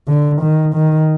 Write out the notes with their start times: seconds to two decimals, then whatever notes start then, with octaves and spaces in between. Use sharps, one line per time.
0.08 D3
0.42 D#3
0.75 D#3